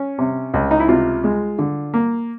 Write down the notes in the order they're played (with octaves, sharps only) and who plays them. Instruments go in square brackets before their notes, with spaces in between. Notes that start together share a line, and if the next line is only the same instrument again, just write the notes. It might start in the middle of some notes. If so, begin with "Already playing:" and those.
Already playing: [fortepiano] C#4
C3
C#2
D#4
E4
C3 F4
G#3
D3
A#3